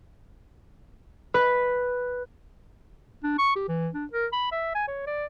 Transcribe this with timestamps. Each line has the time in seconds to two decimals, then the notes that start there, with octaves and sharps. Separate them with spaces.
1.34 B4
3.23 D4
3.39 C#6
3.56 G4
3.68 E3
3.94 D4
4.13 A#4
4.32 B5
4.52 E5
4.75 G#5
4.88 C#5
5.07 D5